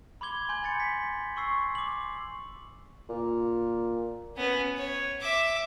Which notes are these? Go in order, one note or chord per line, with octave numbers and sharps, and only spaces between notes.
B5 C6 D6 G#6 G7
G#5 C6 G6 G#6 F#7
B5 A6 C#7 F#7
B6
C6 C#6 E6 C7
D6 F#7
A#2
B3 C#4
C#5
E5 D6